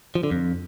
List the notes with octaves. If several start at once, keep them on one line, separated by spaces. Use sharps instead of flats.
F3
D3
F2